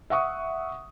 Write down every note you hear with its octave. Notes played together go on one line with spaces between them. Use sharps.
E5 F#5 C#6 D#6